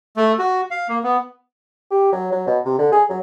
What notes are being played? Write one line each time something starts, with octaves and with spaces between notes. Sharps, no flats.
A3
F#4
F5
A#3
B3
G4
F#3
F#3
B2
C3
D3
G#4
F#3